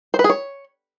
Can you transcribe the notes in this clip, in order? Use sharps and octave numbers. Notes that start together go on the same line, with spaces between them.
C5
B4
G#4
C#5